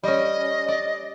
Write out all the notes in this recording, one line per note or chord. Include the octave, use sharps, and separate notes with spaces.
G3 C#4 D#5
D5